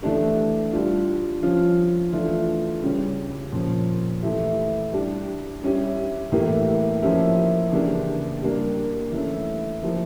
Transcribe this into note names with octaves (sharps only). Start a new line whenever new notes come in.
E3 A3 D4 G4
G3 D4 F4
F3 C#4 F4
E3 A3 D4 F4
C#3 G3 C#4 G4
A#2 F3 C#4
E3 A3 E4 G4
G3 D4 G4
G3 C#4 E4 G4
A2 E3 A#3 E4 G4
F3 A#3 C#4 E4 G4
C#3 E3 A#3 D4 G4
G3 A#3 D4 G4
E3 A3 C#4 E4
F3 A#3 E4 G4